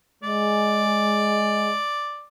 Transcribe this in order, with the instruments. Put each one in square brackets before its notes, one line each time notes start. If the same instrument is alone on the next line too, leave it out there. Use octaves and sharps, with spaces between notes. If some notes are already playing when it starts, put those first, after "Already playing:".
[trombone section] G#3 [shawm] D5